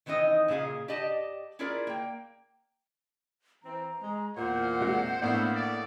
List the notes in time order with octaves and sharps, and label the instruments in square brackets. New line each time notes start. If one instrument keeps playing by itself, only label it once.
[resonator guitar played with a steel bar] D#3 E3 C4 D#4 D#5
A#2 C#3 G#4 D#5 F5
G4 D5 D#5 A5
C#4 E4 F4 G#4 A#4 D5
A#3 G5
[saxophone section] E3 C4 [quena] A#5
[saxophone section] G#3
[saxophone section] E2 A#2 [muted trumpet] C5 [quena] F#5
[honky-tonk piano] C3 G#3 F#4
[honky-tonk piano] A2 B3 D4 [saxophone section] A#3 E4 [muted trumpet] C5
[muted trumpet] D5